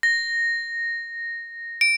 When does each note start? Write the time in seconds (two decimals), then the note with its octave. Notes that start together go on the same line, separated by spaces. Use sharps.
0.03 A#6
1.81 D7